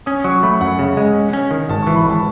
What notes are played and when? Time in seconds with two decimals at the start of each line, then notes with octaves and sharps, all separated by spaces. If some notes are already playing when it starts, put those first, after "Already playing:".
0.06 C#4 D#6
0.24 F#3 C#6
0.43 A3 B5
0.61 F#2 F#5
0.79 C#3
0.97 G#3
1.14 C#4
1.33 C#4
1.51 D#3
1.69 G#1 A5
1.82 E3 C#6
1.95 B5
2.05 G#1 A5